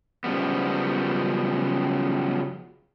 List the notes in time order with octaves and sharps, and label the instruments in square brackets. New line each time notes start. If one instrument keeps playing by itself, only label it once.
[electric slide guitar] F#2 C#3 F3 G3 B3